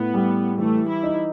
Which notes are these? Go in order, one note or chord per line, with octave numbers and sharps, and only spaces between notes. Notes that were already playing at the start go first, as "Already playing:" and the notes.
Already playing: A2 B3
G3
E3 A3
E4
D#4